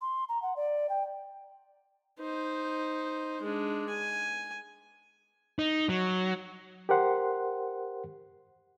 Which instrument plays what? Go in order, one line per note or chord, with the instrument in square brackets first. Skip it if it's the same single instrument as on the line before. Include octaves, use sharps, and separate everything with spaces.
[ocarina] C6
A#5
F#5
D5
G5
[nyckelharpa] D#4 C5
G#3 D4
G#5
[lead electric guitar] D#4
F#3
[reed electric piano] G4 A#4 C5 F#5 C6